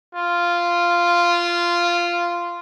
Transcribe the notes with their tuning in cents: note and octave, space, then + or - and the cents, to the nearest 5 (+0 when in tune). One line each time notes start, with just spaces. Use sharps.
F4 -10